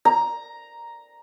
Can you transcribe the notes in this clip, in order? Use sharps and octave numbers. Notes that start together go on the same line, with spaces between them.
A#5